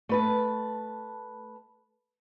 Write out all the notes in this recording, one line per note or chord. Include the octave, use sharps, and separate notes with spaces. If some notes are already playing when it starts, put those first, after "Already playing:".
A3 B4 A5